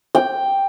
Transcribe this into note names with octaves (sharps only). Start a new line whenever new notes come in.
G5